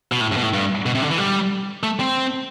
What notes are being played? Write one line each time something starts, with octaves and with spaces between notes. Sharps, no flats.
B2
A2
G2
B2
A2
G2
B2
C3
D3
E3
G3
A3
C4